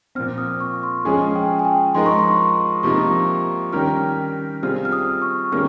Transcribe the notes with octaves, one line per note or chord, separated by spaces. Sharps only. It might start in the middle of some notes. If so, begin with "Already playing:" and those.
A#2 F3 C4 F6
D#6
C#6
C6
F3 G#3 C#4 G#4 G#5
G5
G#5
G5
F3 G#3 D#4 A#4 C6
C#6
C6
C3 F3 A#3 D#4 C#6
D#3 G3 C#4 G4 A#4 F6
C3 G3 C4 F4 G#4 F6
F6
D#6
C#6
D#3 G3 A#3 C#4 G#4 F6